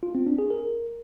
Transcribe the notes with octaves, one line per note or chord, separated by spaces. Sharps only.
F4
C4
D4
G#4
A#4